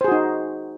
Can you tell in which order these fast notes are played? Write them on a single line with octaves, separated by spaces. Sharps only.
C5 G#4 F#4 D#4